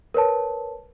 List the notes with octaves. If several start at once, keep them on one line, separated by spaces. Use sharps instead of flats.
A#4 B4 C#5 A5